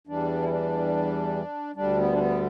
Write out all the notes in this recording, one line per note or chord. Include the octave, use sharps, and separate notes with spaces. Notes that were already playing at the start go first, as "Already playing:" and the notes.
E2 E3 G3 D4
E4
D4
D2 D3 G3 D4
B3
D4
B3